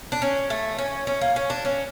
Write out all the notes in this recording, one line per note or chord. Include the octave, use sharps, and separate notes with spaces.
D4
C#4
A3
C#4
C#4
A#3
C#4
D4
C#4